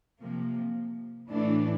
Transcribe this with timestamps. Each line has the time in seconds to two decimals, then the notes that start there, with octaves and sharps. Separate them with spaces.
0.21 C3 F3 A#3
1.30 A2 E3 A3 D4